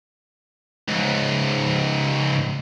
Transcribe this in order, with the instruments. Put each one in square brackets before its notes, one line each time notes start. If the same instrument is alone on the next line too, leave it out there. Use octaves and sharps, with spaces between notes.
[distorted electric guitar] C#2 G#2